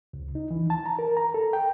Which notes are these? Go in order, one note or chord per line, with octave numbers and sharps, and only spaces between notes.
C#2
D#4
E3
A5
A#5
A#4
A#5
A4
G5